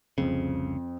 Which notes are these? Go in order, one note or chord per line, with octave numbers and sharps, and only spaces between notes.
F1 C2 F2 C#3